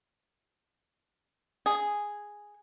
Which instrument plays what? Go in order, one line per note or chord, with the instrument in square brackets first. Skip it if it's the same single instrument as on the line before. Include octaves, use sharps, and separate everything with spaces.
[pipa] G#4